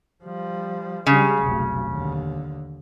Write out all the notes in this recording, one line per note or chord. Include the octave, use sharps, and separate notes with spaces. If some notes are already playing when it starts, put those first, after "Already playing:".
F3 G3
C#3 G3 G#3
F1 B1
D#2 D3